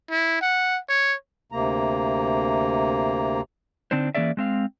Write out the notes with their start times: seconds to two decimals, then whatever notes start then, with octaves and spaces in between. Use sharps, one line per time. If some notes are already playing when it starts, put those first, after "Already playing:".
0.11 E4
0.42 F#5
0.89 C#5
1.52 D2 C3 A#3 A#5
3.91 D3 C4 D4 D#4 C5
4.15 E3 A#3 C#4 G#4 D5 E5
4.37 G#3 C4 F5